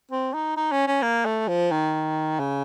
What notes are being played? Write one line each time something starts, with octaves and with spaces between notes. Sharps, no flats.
C4
D#4
D#4
C#4
C#4
A#3
A3
F3
D#3
C#3